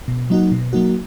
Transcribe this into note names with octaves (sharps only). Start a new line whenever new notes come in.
B2
F#3 A#3 D#4 F#4
B2
F#3 A#3 D#4 F#4